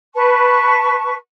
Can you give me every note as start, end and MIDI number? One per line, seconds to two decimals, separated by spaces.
0.14 1.15 71
0.14 1.15 81
0.14 1.15 85